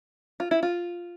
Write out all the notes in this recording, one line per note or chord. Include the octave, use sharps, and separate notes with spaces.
F4
E4
F4